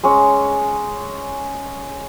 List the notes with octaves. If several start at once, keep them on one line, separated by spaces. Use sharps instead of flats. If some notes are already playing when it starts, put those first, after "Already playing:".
G#3 C#4